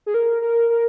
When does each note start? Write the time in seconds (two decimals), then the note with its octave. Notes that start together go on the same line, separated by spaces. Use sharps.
0.06 G#4
0.14 A#4
0.42 A#4
0.69 A#4